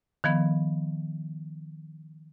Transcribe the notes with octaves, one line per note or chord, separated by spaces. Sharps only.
D#3 F3 B3